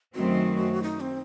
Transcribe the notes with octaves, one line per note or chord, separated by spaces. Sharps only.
F#2 D#3 F#3 A3 C4 F#4
D#4
C4